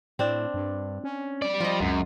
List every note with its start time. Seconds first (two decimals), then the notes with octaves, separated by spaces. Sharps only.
0.19 A2 C4 D4
0.54 G2
1.04 C#4
1.42 G3 D5
1.60 F3 F4 D#5
1.81 C#2 F#2